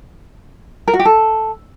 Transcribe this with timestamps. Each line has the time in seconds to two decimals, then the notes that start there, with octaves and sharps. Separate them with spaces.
0.88 A#4
0.94 F#4
0.99 G4
1.05 A4